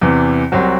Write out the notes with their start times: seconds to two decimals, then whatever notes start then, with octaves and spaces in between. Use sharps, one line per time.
0.01 E2 C3 E3
0.52 C2 C3 F#3 C4 F#4